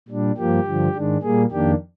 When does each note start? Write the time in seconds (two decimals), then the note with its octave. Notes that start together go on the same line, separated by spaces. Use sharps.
0.08 A#2 G3 D4
0.37 G2 F3 A#3 G4
0.66 G2 D3 F3
0.95 G#2 D#3 G#3 D4
1.22 A#2 G3 A#3 G#4
1.51 F2 D#3 A#3 D4 G4